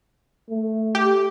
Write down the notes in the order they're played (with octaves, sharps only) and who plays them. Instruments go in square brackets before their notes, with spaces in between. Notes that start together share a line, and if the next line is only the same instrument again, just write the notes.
[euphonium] A3
[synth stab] G4